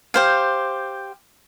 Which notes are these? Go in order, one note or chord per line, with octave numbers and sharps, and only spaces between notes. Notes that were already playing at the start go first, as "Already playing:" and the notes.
G4 C5 F5